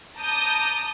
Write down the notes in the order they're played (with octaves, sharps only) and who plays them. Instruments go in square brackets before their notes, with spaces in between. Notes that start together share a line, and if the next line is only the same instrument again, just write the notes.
[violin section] A5 A#5 D6 D#6 G6